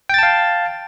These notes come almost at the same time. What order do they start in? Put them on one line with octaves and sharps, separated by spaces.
G5 A6 A5 F5